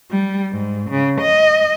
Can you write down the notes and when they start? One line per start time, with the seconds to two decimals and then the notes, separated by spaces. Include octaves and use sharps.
0.11 G3
0.51 G#2
0.90 C#3
1.20 D#5